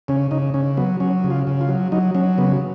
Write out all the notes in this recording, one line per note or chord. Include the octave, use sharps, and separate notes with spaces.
C#3 C#4
C#3 D#4
C#3 C#4
F#3 B3
F#3 C#4
C#3
F4
C#3
F4
F#3
F#3 D#4
F#3 C#4
C#3 B3